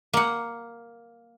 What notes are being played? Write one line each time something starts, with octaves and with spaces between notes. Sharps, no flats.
A#3 F#5